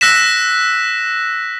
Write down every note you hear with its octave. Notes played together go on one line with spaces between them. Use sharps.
E6 F#6 A#6 B6 E7